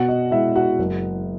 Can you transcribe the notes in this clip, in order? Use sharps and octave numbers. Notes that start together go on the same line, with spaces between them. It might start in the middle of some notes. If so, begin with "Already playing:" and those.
Already playing: B2 F#4 F#5
D#5
G#3 E4 E5
F#4 F#5
F#1